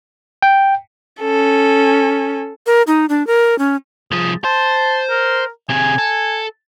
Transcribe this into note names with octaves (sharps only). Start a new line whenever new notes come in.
G5
C#4 A4
A#4
D#4
D4
A#4
C#4
C2 F3 G#4
C5 A5
A#4
C3 G#4 G#5
A4